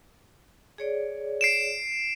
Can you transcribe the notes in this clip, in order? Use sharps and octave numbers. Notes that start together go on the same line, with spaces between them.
G#4 C#5 D5
C7 D7 E7